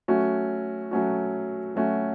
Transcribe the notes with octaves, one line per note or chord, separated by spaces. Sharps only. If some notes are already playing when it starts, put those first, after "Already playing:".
F#3 A3 C#4 F#4
F#3 A3 C#4 F#4
F#3 A3 C#4 F#4